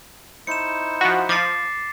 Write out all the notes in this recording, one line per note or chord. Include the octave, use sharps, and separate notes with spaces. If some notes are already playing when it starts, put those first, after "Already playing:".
D#4 E4 C5 C#7 E7
F3 F#4 B6
F3 D6 A6 C7